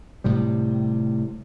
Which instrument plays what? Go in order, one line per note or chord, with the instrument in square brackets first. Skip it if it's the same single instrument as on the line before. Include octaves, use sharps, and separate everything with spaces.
[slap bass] A2 C3 G3